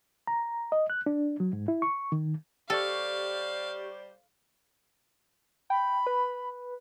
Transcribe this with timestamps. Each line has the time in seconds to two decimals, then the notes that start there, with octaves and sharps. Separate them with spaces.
0.27 A#5
0.72 D#5
0.90 F#6
1.06 D4
1.40 F#3
1.53 G#2
1.68 E4
1.82 C#6
2.12 D#3
2.70 G3 G4 A4 C5 D5 F5 C#6
5.70 G5 B5
6.07 B4